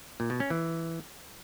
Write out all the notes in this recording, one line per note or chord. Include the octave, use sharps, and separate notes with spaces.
A#2
B2
C#4
E3